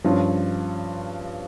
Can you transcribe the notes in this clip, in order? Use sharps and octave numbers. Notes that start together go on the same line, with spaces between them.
G2 F3 C#4 F4